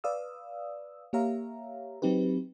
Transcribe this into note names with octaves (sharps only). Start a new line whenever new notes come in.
B4 D5 F5 D#6 E6
A#3 G4 C#5 E5 F5 A#5
F#3 C4 D#4 G4 B4